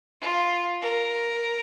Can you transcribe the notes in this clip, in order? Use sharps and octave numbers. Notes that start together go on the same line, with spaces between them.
F4
A#4